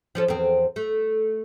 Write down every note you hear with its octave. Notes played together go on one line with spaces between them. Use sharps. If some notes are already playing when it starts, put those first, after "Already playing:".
F3 C#4 A4
E2 C4
A3